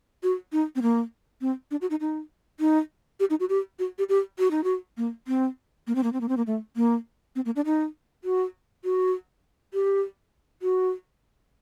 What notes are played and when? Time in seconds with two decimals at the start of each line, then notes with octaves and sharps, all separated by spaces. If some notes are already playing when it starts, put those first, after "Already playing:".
0.23 F#4
0.52 D#4
0.76 C4
0.82 A#3
1.41 C4
1.71 D4
1.81 F#4
1.90 D#4
2.00 D#4
2.60 D#4
3.20 G4
3.30 D#4
3.40 F#4
3.49 G4
3.79 F#4
3.99 G4
4.09 G4
4.39 F#4
4.51 D#4
4.64 F#4
4.97 A#3
5.28 C4
5.87 A#3
5.95 C4
6.03 A#3
6.13 C4
6.21 A#3
6.29 C4
6.37 A#3
6.47 A3
6.76 A#3
7.36 C4
7.45 A#3
7.56 D4
7.66 D#4
8.24 F#4
8.84 F#4
9.74 G4
10.62 F#4